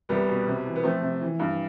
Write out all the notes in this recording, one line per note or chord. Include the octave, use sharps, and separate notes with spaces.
C2 G3 B3
B2
C3
E3
B3
F3 A3 C4
C3
E3
G2